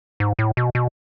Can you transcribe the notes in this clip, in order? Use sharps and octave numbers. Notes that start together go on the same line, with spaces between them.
G#2
A2
B2
B2